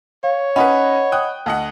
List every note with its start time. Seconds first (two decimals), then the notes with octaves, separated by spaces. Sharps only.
0.24 C#5 F5
0.56 C#4 D#4 B4 D#5 F#5 B5
1.12 G5 D#6 F#6
1.46 D2 D#5 F#5 A5